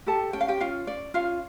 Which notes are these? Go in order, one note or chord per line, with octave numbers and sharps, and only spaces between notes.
G4 A4 A5
C#4 G5
F5
G4 G5
C#4 F4 F5
C#4 D5
C#4 F4 F5